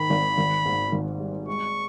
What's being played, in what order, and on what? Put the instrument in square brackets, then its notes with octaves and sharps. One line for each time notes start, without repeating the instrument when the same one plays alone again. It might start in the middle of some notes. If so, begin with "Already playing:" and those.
Already playing: [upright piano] G#2 D#3 [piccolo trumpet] B5
[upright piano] G#1
G#1
G#2
G#1
G3
[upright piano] G#3 [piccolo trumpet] C#6